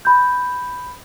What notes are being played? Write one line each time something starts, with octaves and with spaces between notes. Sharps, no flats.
B5 G6